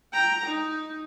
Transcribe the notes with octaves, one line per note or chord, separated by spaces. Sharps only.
G5 A#5
D#4